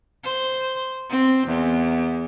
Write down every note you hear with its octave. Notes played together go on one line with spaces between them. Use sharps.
C5
C4
E2